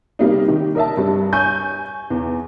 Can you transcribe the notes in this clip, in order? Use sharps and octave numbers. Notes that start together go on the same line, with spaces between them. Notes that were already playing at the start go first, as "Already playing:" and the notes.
C3 G3 A#3 D#4
D#3 G4
A#4 D#5 E5 A5
G2 G3
G#5 C#6 G6
E2